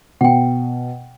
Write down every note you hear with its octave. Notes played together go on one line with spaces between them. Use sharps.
B2 F#5 G5